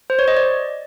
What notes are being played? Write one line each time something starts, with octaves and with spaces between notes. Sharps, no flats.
C5
C#5
D#5
D5